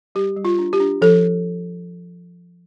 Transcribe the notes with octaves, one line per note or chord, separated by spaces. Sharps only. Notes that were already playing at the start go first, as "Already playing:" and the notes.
G3 G4
G3
F4
D4
G4
D4
F3 A4